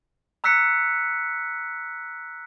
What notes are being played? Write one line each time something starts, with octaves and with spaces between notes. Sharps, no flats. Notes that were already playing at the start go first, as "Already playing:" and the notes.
A#5 E6 F#6 B6 C#7